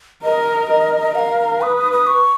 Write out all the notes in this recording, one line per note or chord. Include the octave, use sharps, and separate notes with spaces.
A#4 D#5
A#4
A#4 F5 F#5
B4 D#6
D#6
D#6
C#6